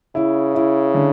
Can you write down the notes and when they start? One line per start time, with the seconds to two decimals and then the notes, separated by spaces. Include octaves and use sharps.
0.15 C#3 E4
0.55 E4
0.94 D3